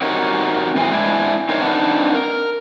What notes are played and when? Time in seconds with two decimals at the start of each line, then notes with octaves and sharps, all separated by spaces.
0.02 C4 D#4 F#4 G4 A#4 C#5
0.76 A2 E3 C4 G#4
0.90 G#3 C4 D4 E4 G#4
1.49 C4 D#4 A#4 C5 C#5
1.61 C4 D4 D#4 B4 F#5 A5
2.14 A#4